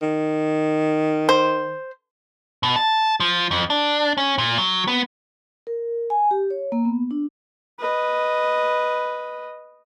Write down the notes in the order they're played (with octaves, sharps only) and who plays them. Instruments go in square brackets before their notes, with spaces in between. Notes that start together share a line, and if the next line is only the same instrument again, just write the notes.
[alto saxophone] D#3
[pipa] C5
[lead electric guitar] B2
A5
F3
F2
D4
C#4
A#2
F#3
B3
[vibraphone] A#4
G#5
G4
C#5
A#3
B3
D4
[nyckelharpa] B4 D#5